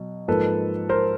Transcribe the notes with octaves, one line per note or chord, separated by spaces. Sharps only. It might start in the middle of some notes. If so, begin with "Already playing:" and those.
Already playing: B2 F#3
G#2 F3 A#3 A4 B4
A#4 C5